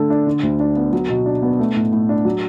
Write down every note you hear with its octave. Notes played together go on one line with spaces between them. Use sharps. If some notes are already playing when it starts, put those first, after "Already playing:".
Already playing: D3 A3 D4 A4
D4
D3
D2
D4
B3
F#3
B2
D4
B3
A3
A2
A2
D4
F#3